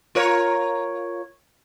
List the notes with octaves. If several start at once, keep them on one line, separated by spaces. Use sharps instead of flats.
F4 A#4 C#5